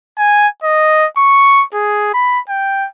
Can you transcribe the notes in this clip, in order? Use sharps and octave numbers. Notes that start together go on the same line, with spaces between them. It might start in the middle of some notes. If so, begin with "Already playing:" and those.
G#5
D#5
C#6
G#4
B5
G5